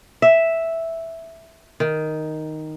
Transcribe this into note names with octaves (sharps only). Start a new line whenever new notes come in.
E5
D#3